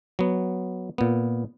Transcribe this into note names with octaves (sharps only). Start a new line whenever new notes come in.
F#3 B3
A#2 B3